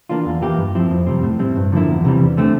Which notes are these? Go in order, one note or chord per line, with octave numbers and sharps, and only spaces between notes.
E3 A#3 D4 F4
E2
E3 A#3 E4 G4
G2
F3 C4 E4
F2
C3 G3 C4
A2
G3 C4 E4
G2
D3 F3 A#3 E4
E2
C3 E3 G3
E2
D3 A3 C4